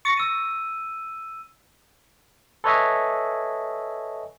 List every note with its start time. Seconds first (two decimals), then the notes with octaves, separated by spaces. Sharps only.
0.05 C#6 A6 A#6
0.17 E6 D#7
2.64 A4 B4 C#5 D#5 E5 G#5